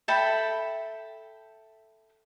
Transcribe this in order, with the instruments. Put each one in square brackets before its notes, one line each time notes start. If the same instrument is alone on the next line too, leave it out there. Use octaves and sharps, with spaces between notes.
[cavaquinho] A4 E5 G5 B5